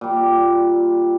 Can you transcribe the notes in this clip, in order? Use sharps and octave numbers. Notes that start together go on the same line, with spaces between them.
A#2 G3